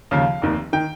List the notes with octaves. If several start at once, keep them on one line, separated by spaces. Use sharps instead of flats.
D#2 C#3 F3 F5
F1 D#2 D#3
D#3 G5